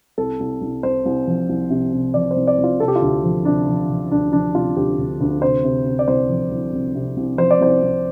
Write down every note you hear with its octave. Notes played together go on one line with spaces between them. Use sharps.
C2 A4
C2
C2
C2 C5
C2
F3
C2
C3
C3
F3 D5
C5
C2
D5
C2
F4
C3 A4
G4
F4
D2 G4
F3
C3 D4
F3
F3
D2 D4
F3 D4
C3 F4
D2 G4
D2
D2
C3 C5
C3
C3
D5
C2 C5
F3
C2
C2
C3
C2
F3 C5
D5
C2 C5
C2